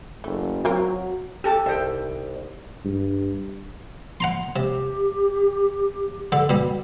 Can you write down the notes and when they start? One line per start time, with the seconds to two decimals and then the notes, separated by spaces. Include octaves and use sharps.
0.24 F#1 A3
0.65 F#3 C4 F4 F#4 A#4
1.44 G4 A4 A5
1.66 C2 D#4 E5 G5
2.85 G2
4.20 F#5 A#5 C6
4.56 C3 G4
6.32 D3 A4
6.49 B2 G3